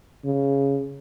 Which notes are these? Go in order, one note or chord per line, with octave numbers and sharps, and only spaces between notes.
C#3